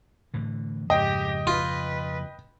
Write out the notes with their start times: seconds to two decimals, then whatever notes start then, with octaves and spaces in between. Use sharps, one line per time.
0.34 A2 D3 E3
0.90 F2 G#2 C#3 G4 D#5 G5
1.47 F4 B4